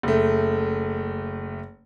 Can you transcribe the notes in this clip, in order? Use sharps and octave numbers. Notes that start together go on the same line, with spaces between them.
F#1 A3